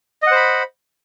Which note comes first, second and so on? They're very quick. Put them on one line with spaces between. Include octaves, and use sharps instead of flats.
D#5 F#5 C5 B5